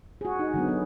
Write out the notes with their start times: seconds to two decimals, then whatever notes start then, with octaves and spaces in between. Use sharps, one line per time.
0.21 F#4 G#4
0.39 D#4
0.54 D3 F#3 B3
0.69 B3